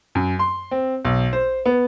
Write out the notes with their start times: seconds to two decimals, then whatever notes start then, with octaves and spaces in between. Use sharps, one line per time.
0.15 F#2
0.39 C6
0.71 C4
1.05 B1
1.33 C5
1.66 B3